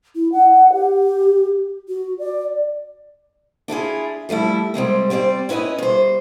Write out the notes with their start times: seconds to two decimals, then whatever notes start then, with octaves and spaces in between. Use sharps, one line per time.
0.15 E4
0.32 F#5
0.73 G4
1.89 F#4
2.19 D5
3.68 D4 E4 F4 G#4
4.29 F3 G3 A3 E4
4.74 C3 G3 G#3 C4
5.10 G3 C4 C5 D5
5.49 C#4 E4 B4 D5 D#5
5.78 G2 C5